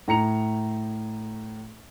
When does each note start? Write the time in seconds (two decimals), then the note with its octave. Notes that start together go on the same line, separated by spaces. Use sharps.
0.08 A2 A#5 C#7 F7